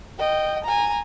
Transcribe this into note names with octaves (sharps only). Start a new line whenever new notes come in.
D#5 G5
G#5 A#5